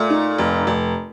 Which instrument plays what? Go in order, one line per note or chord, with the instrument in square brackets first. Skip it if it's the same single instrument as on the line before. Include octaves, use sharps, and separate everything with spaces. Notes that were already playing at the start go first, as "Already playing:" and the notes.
Already playing: [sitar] A#2 [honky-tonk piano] A3
[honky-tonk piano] D#4
F1
F1